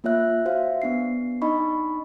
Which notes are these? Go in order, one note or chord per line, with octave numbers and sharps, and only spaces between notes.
A#3 F4 C#5 E5 F#6
F#4 C5 E5 F5
B3 D4 C7
D4 D#4 D#5 B5 C#6